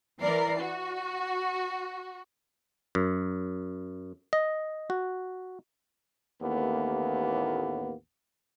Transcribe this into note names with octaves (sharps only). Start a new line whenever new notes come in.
E3 A#4 D5 C7
F#4
F#2
D#5
F#4
A1 D#2 A2 A#3 B3